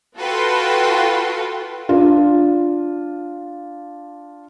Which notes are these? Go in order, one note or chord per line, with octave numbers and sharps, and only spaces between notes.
F4 F#4 A4 B4 G5 C6
D4 F4